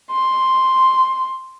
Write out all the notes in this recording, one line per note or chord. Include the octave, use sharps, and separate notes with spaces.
C6